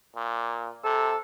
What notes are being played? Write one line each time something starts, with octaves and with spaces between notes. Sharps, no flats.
A#2
C3 A4